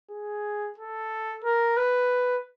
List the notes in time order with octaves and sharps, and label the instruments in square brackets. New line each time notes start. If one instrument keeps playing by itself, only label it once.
[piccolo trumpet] G#4
A4
A#4
B4